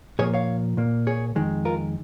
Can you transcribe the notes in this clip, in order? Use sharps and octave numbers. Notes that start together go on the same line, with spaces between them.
A#2 F3 A#3 G#4 C#5
C#5 F5
A#2 A#3
G#4 C#5
F2 D#3 G#3
F4 A#4